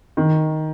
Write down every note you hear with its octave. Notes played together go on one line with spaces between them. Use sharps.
D#3